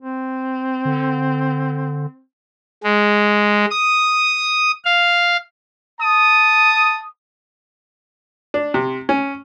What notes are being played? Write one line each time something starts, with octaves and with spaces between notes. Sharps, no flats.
C4
D3
G#3
D#6
F5
A5 D#6
D4
C3
C#4